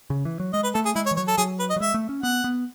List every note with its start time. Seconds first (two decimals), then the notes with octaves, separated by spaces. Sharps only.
0.10 C#3
0.25 E3
0.40 F#3
0.54 G#3 D#5
0.63 B4
0.75 A3 A4
0.85 G#4
0.96 G#3 E4
1.06 C#5
1.11 E3
1.16 F#3 C#5
1.28 A4
1.38 F#3 G#4
1.60 B4
1.70 D#5
1.76 F#3
1.80 G#3 E5
1.94 A3
2.09 C#4
2.23 B3 F#5
2.44 B3